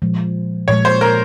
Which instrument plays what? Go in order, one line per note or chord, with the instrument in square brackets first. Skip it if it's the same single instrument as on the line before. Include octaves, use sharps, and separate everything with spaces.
[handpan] A#2 F3 G#3
[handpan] A#2 F3 G#3 [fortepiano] C#5
[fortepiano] C5
A#4